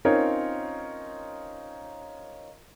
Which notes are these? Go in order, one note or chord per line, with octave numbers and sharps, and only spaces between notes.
C4 C#4 D#4 F4 A#4 C#5